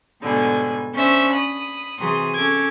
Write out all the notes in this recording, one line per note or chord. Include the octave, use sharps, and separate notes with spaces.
G#2 B2 D3 G3 G#5
C#4 D4 C5 E5
B5 D#6
C3 E3 F#3 G#4 C6 D#6
C#4 A4 D6 G#6